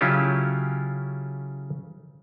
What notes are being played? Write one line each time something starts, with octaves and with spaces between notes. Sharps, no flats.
C#3 F#3 C#4 E4 F4 G4